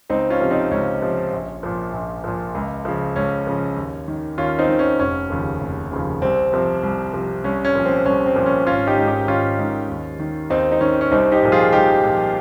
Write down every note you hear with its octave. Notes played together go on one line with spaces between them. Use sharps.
C#2 C4 D#4
C#4 F4
C3 F3
C4 D#4
C#2 C#4
C3 F3
A#1
A#2 F3
A#1
A#2 F3
C#2
C#3 F3
C#2 C#4
C#3 F3
D#2
D#3
D#2 C#4 F4
C4 D#4
D#3
C#4
F1 C#4
D#2 C#3 F3
F1
D#2 C#3 F3
C2 C4
C3 F3
C2
C3 F3
C2 C#4
C#4
A#2 F3
C4
C2 C#4
C4
A#2 F3
C#4
G#1 C#4 F4
D#4 G4
G#2 D#3
D#4 G4
G#1 C#4 F4
G#2 D#3
D#2
D#3
D#2 C4 D#4
D#4
D#3 C#4
C#4
C2 C4 D#4
D#4 G4
A#2 F3
F4 G#4
C2 D#4 G4
A#2 F3